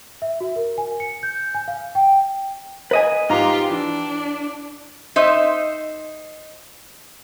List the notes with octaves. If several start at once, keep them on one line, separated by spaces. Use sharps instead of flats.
E5
F#4
A#4
G#5
C#7
G6
G#5
F5
G5
B4 D#5 G#5
G#2 F4 G4 A#5 D6
E3 D4
D#4 C5 E5